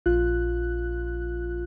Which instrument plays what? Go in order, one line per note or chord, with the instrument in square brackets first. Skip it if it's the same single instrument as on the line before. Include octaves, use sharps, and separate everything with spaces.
[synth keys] A#1 F4 F#6